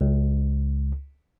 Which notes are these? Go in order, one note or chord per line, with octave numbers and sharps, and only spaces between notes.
C#2